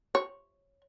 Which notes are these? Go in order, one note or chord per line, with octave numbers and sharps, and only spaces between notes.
C#5